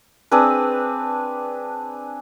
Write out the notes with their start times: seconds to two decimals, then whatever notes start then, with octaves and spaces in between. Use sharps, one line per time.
0.31 C4 D4 G#4 B4